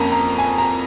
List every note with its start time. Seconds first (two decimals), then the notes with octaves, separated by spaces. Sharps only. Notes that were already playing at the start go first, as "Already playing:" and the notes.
Already playing: F2 A#3 C#4 A#5
0.12 A#5
0.39 G#5
0.58 A#5